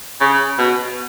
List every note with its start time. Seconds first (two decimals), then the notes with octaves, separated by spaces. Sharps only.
0.21 C#3
0.58 B2